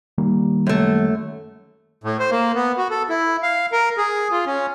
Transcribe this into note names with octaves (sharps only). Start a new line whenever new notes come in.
D#3 G3 A#3
F#2 A3
A2
C5
A#3
B3
F#4
A4
E4
F5
A#4
G#4
F4
C#4